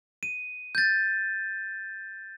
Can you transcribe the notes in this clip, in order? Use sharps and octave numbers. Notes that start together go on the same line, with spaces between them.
D#7
G6 A6